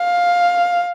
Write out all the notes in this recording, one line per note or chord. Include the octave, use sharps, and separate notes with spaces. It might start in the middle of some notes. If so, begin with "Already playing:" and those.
Already playing: F5